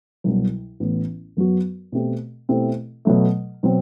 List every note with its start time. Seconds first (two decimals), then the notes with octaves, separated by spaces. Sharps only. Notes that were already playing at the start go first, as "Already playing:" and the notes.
0.24 C2 B2 F#3
0.80 A1 A2 E3 B3
1.37 F#2 F#3 B3 F#4
1.92 B2 A3 C4 G4
2.49 B2 A3 C4 E4 G4
3.05 B2 F#3 A3
3.63 B2 F#3 C4